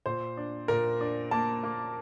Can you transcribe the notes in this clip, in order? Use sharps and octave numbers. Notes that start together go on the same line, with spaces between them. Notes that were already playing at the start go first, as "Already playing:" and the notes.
A#2 C5
D4
A#2 A#4
D4
A#3 A5
A#3